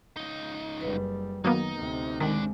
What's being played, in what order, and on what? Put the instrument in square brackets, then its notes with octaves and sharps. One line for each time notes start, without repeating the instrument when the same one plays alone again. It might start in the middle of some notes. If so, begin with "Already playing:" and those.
[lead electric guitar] C#2 D#4
[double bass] F#1 G3 [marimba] B4
[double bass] D#3 [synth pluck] F#3 A#3 B3 [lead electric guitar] D#4
[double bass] D2 C3
[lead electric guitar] A2 D4 [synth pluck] D#3 [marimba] G#3